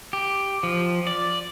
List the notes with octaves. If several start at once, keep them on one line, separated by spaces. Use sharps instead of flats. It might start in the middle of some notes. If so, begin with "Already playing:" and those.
G4
F3
D5